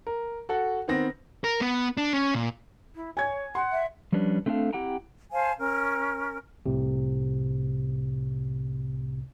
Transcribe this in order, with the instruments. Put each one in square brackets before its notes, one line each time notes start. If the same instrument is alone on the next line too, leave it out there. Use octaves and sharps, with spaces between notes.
[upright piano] A#4
F#4 A4 F#5
D#3 B3 C4 A#6
[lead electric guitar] A#4
B3
D4
C#4
A#2
[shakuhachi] E4
[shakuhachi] C#5 [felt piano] G#5 G#6
[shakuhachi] F#5 [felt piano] C6
[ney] E5
[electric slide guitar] F3 G3 C#4 D4 B4
A3 C4 D4 G4 A4 F5
C4 E4 G4 F#5 G5 A#5
[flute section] C5 F5 G#5 A5
C#4 A#4
[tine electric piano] C2 A2 C3